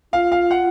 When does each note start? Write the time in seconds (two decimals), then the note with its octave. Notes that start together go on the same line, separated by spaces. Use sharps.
0.13 F4 F5
0.32 F5
0.51 F#5